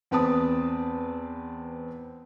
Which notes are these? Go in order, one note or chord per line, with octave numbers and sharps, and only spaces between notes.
E2 C4 B4 A5 D#6